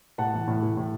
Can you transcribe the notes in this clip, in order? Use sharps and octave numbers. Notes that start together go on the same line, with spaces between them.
A2 F#5 A5
E3
A2
E3
A2